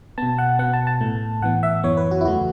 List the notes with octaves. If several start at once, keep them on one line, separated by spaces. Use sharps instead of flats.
B2 B3 A5
F#5
B2 B3 F#5
A5
A5
A2 A3
A2 E3 B3 F#5
E5
F#2 E3 B3 C#5
B4
F#4
E4
E2 C#3 A3 F#4